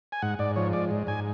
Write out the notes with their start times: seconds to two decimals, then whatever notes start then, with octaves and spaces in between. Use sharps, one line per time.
0.12 G#5
0.22 G#2 F#5
0.39 G#2 D5
0.56 F3 C#5
0.73 G#3 D5
0.91 G#2
1.07 G#2 G#5